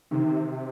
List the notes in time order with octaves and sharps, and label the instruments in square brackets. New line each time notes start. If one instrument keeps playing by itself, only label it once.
[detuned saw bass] C3 [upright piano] D#3